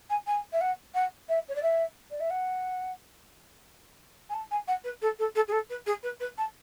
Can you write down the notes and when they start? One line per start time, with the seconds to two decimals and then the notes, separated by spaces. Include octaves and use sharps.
0.09 G#5
0.26 G#5
0.52 E5
0.61 F#5
0.94 F#5
1.28 E5
1.48 C#5
1.55 D5
1.62 E5
2.10 D5
2.20 E5
2.30 F#5
4.29 G#5
4.34 A5
4.51 G#5
4.68 F#5
4.84 B4
5.02 A4
5.19 A4
5.35 A4
5.48 G#4
5.52 A4
5.70 B4
5.86 G#4
6.03 B4
6.20 B4
6.38 A5